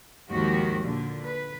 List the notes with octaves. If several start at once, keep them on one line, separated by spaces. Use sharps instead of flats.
D#2 G#2 D#3 F3 F#4 G4
A#2 D3
B4